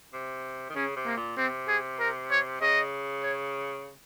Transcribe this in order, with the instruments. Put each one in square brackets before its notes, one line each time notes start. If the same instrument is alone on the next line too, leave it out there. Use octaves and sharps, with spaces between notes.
[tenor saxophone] C3
D#3
[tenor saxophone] C#3 [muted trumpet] C#4
[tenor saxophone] C3
[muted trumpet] A#3
[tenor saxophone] A#2
[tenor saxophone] C3 [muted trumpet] C4
[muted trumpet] G#4
A#4
C#5
[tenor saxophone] C#3 [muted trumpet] D#5
[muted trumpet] C#5